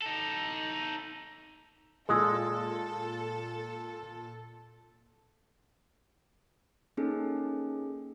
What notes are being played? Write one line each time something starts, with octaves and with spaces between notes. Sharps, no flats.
D#4 A4
A#2 G#3 G#4 A4 D#6 E6
A#3 C#4 D#4 G#4 A4